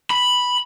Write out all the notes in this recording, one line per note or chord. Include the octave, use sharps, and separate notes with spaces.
B5